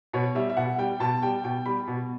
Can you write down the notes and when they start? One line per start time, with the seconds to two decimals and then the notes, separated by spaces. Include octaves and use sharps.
0.13 B2 C#5
0.35 G3 E5
0.50 E5
0.57 B2 F#5
0.78 G3 G5
1.00 B2 A5
1.22 G3 G5
1.44 B2 G5
1.66 G3 B5
1.87 B2